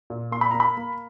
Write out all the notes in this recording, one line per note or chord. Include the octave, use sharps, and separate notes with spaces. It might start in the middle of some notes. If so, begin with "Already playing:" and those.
A#2
A#3 C6
B5
A#3 A#5
B5
A#3